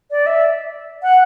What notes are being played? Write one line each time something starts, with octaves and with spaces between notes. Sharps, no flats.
D5
E5
F#5